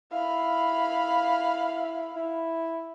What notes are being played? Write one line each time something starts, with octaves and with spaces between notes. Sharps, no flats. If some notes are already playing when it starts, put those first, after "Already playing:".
E4 F5 B5
E4